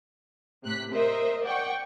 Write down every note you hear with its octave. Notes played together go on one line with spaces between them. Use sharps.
A2 C3 F#6 B6
A#4 C5 D#5 E5
D5 F#5 G5 C#6